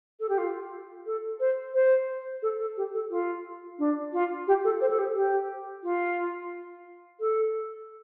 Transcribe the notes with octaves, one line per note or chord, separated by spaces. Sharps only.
A4
G4
F4
A4
C5
C5
A4
A4
G4
A4
F4
D4
F4
G4
A4
C5
A4
G4
G4
F4
A4